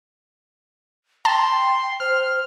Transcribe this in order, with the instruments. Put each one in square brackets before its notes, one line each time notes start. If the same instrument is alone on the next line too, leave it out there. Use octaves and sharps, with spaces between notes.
[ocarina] G5 [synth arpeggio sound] A5 [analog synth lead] C6
[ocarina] C5 [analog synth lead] F6